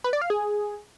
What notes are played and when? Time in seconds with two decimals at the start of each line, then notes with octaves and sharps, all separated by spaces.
0.04 B4
0.13 D5
0.22 F5
0.30 G#4